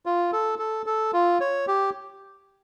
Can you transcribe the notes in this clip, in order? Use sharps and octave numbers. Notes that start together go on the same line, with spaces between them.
F4
A4
A4
A4
F4
C#5
G4